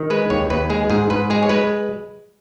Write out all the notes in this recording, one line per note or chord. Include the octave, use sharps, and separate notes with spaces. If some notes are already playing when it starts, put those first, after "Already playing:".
Already playing: D#3
G#3 B4
D#2 C#5
D#2 B4
G#3 G#4
G#2 G#4
G#2 B4
G#3 G#4
C#5
G#3 B4